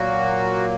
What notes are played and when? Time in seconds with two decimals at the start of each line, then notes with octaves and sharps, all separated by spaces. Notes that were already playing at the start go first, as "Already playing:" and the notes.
Already playing: A#2 F#3 A#3 F#4